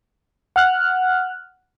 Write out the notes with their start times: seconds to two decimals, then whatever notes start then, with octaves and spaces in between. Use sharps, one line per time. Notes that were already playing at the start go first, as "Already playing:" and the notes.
0.56 F#5 F6 F#6